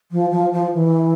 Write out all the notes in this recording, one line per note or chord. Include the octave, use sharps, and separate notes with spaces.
F3
F3
F3
E3